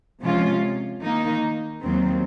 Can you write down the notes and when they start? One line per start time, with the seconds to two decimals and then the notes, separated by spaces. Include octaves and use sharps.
0.21 C3 F3 G#3 C#4 F4
1.02 D#3 A#3 D#4
1.82 D#2 D#3 F#3 C4